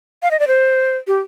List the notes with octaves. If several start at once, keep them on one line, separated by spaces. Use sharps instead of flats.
F5
D#5
D5
C5
G4